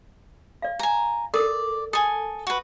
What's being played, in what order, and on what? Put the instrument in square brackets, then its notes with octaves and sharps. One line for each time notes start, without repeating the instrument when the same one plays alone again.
[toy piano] D5 F5
[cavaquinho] G#5 A#5
[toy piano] A4 A#4 D6 [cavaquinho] D5
[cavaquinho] A4 G#5 [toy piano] D#6
[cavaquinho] F#4 B4